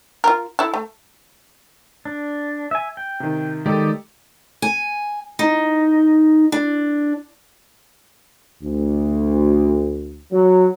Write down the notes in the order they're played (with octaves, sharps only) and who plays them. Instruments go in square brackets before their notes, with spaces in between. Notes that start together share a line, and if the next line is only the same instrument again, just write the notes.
[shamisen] F4 A#4
E4 A4
A3
[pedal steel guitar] D4
E5 G#5
G5
[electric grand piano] C3 D#3
[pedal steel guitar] D#3 D5 D#5 [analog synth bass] G#3 [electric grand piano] G4 A4
[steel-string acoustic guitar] G#5
D#4
D4
[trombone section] D2
F#3